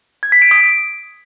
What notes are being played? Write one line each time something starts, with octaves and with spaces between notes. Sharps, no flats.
G#6
B6
D7
D#6